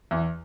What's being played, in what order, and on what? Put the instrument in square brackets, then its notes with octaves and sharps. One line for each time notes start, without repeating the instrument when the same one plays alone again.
[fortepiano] E2